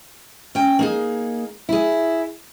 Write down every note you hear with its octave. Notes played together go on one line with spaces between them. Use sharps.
C#4 G5
A#3 D#4 G#4
E4 G#4